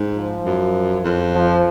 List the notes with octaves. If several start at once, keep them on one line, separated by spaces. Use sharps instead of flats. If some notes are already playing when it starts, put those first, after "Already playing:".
Already playing: G#2
F3
F#2
F2
F3